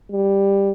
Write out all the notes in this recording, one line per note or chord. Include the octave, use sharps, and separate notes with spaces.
G3